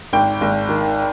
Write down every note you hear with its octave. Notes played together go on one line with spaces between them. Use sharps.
G#1 G5
G#1
D#3